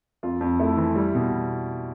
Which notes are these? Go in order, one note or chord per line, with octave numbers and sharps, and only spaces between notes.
F2 F4
F2
A3 E4
E3
G3
B2